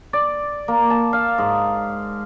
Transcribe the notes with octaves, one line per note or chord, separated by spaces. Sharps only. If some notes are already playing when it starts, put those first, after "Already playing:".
D5
A#3
A5
F5
G#2